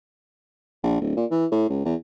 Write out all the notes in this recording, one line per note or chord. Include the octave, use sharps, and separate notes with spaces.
A#1
D1
A#2
E3
A2
C#2
E2